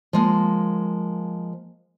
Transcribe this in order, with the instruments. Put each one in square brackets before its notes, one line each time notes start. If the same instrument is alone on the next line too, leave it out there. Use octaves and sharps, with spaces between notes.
[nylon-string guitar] F3 G#3 A#3